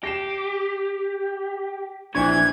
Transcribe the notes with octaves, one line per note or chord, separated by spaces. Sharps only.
G4 A#6 C7 E7
A#1 C3 E3 D4 C#6 G#6